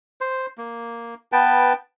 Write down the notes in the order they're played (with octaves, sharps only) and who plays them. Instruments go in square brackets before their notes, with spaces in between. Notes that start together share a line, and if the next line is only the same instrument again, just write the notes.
[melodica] C5
A#3
B3 B4 G5 A5